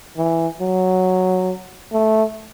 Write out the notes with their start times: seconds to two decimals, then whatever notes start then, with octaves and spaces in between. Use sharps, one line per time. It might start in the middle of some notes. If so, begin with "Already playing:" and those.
0.17 E3
0.61 F#3
1.93 A3